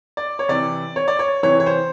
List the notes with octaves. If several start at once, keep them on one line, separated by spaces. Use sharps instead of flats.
D5
C#5
C3 E3 D5
C#5
D5
C#5
C3 E3 C#5
C#5
C5